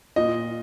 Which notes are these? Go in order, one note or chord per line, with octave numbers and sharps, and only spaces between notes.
A#2 D#5